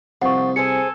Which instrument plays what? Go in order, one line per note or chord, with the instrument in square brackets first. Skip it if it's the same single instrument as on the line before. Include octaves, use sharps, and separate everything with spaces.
[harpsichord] C2 [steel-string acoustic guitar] F3 F4 C5 [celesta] F#5 C#6
[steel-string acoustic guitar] G#4 C5 [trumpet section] A4 G#5 [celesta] C#7